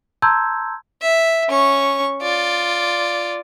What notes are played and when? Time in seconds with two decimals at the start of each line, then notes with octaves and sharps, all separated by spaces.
0.22 A5 A#5 C6 E6 G6 G#6
1.02 E5
1.49 C#4 C#6
2.22 F4 D5